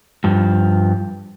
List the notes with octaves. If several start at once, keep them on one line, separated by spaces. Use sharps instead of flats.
G2 F3